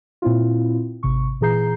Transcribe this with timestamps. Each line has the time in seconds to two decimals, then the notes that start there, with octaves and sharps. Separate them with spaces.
0.22 A#2 C4 E4 F4
1.03 G#1 C3 C#6
1.41 A#2 E3 G#4 A#5 G6 C7